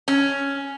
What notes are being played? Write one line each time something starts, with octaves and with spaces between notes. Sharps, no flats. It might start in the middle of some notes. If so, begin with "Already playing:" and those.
C#4